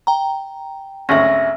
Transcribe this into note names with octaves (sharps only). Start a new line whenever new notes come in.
G5 A#5
G#1 D2 C#4 E5 A#6